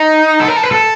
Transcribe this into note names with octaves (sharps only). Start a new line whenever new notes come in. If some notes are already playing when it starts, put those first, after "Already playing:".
Already playing: D#4
A4
A#4
A4
B4
A4